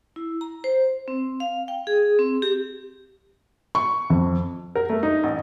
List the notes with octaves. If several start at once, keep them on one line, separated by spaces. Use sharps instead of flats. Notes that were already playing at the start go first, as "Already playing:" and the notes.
E4
A#5
C5
C4
F5
G5
G#4
C4
G4
C#6
F2
A#4
A3
D#4
A1